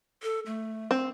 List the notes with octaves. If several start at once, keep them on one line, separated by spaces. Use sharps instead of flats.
A4
A3
C4